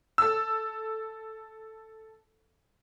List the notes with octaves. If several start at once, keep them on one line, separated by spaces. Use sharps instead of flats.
A4 E6